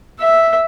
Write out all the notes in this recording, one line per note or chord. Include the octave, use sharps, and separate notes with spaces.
E5